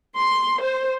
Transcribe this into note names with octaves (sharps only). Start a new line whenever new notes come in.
C6
C5